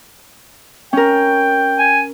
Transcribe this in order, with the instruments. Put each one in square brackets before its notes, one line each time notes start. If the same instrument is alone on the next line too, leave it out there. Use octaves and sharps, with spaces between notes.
[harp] C#4 A#4 [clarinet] G5
[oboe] G#5